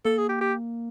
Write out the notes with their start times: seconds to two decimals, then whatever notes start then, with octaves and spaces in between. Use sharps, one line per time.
0.05 A#3 A4
0.18 G#4
0.29 G4
0.41 G4